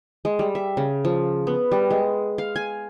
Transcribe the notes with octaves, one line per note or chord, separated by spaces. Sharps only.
G#3
G3
E5
C#3
F3
B3
G3
G#3
F5
G#5